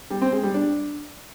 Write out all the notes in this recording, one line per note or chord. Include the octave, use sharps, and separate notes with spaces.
G3
C4
G#3
G3
D4